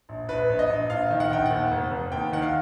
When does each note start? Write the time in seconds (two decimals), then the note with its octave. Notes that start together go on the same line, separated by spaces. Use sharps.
0.09 A#1
0.28 A#1 B4
0.49 A#1
0.59 D#5
0.70 A#1
0.90 A#1 F5
1.10 D#3
1.20 F#5
1.31 A#1 G5
1.46 F#5
1.51 D#2
1.71 F1
1.91 F1
2.12 D#2 G5
2.32 D#3 F#5
2.42 F5